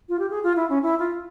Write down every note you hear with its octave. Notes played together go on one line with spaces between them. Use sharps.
F4
G4
G#4
F4
E4
C#4
E4
F4